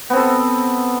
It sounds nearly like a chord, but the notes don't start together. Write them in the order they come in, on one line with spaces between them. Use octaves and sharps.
B3 C4 A4